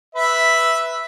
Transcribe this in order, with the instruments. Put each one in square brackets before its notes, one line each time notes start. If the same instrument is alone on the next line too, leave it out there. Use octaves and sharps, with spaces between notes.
[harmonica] B4 E5